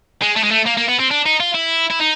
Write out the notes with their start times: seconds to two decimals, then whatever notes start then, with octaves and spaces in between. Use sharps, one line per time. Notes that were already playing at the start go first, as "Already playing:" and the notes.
0.22 G#3
0.36 A3
0.44 G#3
0.51 A3
0.66 A#3
0.77 A#3
0.89 B3
0.99 C4
1.11 D4
1.26 D#4
1.40 F4
1.55 E4
1.91 E4
2.00 D#4